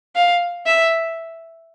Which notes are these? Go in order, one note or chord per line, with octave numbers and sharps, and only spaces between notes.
F5
E5